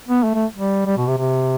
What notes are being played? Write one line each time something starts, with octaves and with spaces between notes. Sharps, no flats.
B3
A3
A3
G3
G3
B2
C3
C3